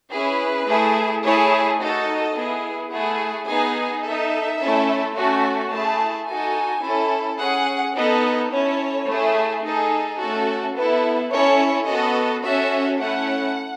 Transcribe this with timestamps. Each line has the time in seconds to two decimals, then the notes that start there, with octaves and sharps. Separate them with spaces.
0.11 C#4 E4 G#4 B4
0.67 A3 E4 G#4
1.23 A3 E4 G#4 C#5
1.79 D#4 F#4 A4 D#5
2.35 B3 E4 G#4
2.92 A3 E4 G#4 F#5
3.47 B3 D#4 G#4 G#5
4.04 D#4 A4 E5
4.59 A3 C#4 E4 A4
5.15 A3 C#4 F#4
5.72 A3 E4 G#4 A5
6.28 D#4 F#4 A4 G#5
6.84 C#4 E4 A4
7.40 C#4 G#4 F#5
7.96 B3 D#4 A4 D#5
8.52 C#4 E4 A4 C#5
9.08 A3 E4 G#4
9.64 D#4 G#4 A4
10.21 A3 C#4 F#4 A4
10.76 B3 E4 A4 B4
11.32 C#4 E4 A4 C#5
11.88 B3 F#4 A4 D#5
12.44 C#4 F#4 A4 E5
13.01 A3 C#4 E4 F#5